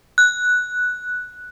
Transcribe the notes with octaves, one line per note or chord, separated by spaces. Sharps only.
F#6